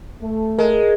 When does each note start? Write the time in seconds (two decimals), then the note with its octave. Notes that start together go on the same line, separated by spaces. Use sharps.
0.22 A3
0.59 G#3 A#4